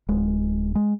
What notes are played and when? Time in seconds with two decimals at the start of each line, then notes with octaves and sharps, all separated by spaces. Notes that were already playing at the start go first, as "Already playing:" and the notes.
0.09 D1 G#3
0.75 G#3